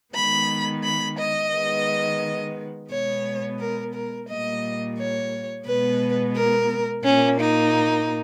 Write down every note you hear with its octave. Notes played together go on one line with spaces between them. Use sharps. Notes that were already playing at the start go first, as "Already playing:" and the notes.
D#3 G#3 B3 B5
B5
D#5
D#3 G#3 B3
B2 G#3 B3 C#5
A#4
A#4
A#2 G3 A#3 D#5
C#5
B2 G#3 B3 B4
A#4
A#2 A#3 C#4
D#4